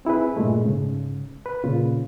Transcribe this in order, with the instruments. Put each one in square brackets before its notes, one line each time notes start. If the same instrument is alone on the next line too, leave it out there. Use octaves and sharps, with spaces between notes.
[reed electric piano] C4 E4 G#4 B4
G2 A#2 G#3 A3
G#2 C#3
B4
A#2 C#3 F4